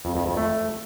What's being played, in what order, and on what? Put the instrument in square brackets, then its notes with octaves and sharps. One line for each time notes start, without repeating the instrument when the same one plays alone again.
[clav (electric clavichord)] F2
F2
F2
A3